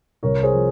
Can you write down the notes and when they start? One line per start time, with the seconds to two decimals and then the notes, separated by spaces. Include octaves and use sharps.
0.23 C2 A#4 C#5
0.43 G#4 C5
0.53 F3